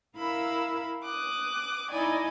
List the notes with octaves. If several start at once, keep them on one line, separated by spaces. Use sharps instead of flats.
E4 A#4 F5 B5 E6
D6 D#6 F#6
D#4 E4 D5 D#5 G#5